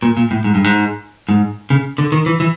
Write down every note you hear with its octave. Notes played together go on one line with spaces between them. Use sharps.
A#2
A#2
A2
G#2
G2
G#2
G#2
C#3
D3
D#3
E3
E3